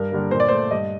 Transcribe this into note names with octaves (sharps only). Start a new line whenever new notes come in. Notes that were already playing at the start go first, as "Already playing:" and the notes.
Already playing: G2 A#4
D3 G3 A#3
A#2 C5
D5
A3 C5
G2 D#5